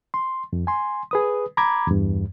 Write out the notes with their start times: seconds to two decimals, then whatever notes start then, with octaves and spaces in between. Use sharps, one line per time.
0.14 C6
0.53 F2
0.67 G#5 C6
1.11 G#4 B4 D#6
1.57 A#5 B5 D6 G#6
1.87 E2 G2